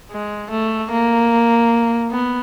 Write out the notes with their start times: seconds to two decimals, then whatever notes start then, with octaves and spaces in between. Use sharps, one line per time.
0.11 G#3
0.51 A3
0.91 A#3
2.11 B3